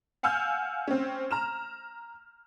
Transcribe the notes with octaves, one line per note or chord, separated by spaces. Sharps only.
F5 F#5 G#5 E6 F6 G6
C4 C#4
A#5 F6 E7